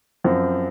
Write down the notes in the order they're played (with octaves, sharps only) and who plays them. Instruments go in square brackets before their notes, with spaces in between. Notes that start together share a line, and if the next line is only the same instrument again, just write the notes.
[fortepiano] F#2 F3 C4